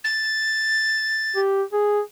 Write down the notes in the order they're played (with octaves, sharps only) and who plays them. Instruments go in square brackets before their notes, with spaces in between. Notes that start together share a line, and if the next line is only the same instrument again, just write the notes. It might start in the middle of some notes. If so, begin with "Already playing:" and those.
[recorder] A6
[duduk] G4
G#4